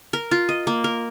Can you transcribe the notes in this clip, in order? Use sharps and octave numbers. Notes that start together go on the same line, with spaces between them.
A#4
F4
D#5
A#3
A#4